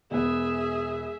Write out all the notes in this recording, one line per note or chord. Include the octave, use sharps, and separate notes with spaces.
E1 B3 G#4 E5